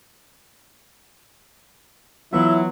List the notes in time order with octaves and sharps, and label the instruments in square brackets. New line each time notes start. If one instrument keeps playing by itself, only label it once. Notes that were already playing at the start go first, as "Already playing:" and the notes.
[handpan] E3 B3 F4 [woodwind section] F#3 [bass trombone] E4 [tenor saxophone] E5